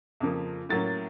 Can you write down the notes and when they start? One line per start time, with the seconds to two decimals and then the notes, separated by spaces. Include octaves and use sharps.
0.20 F2 C#3 F3 A#3
0.69 A2 F#3 A#3 C#4 A6